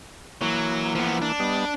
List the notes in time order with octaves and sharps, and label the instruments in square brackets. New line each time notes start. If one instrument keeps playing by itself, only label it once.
[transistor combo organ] E3 A#3 [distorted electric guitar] F#3
[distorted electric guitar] F3 B3
D4
[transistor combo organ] G3 B3 D#5